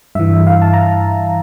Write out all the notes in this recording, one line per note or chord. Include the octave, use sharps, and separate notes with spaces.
G2 E3 E5
F5
A5
A#5